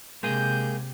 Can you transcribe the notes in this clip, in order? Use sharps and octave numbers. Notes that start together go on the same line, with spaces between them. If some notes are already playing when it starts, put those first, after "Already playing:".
C3 G#3 A#3 G#4 G6